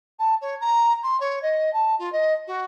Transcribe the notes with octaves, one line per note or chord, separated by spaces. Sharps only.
A5
C#5
A#5
C6
C#5
D#5
A5
F4
D#5
F#4